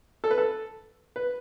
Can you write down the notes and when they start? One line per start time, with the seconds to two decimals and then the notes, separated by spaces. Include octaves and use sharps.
0.24 A4
0.31 B4
0.38 A4
1.16 B4